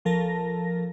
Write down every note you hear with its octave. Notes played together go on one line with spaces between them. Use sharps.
A#1 F3 A4 A#4 A5 A#6